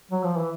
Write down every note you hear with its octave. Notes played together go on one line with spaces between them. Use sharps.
F#3
F3
E3